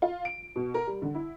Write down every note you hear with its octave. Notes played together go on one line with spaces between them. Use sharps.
F4
D7
B2
A#4
G3
D3
E4